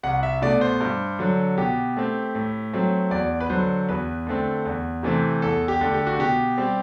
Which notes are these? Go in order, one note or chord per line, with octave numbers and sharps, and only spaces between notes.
C2 F#5
E5
B2 A3 D5
C5
G2
D3 F#3
B2 G4
A3 C4
A2
F#3 A3 C4
E2 D5
B4
D3 F#3 C5
E2 B4
D3 A3 C4
E2
C3 E3 A3 C4
E2 A4
G4
D3 A3
G4
F#4
B2 G4
G3 C4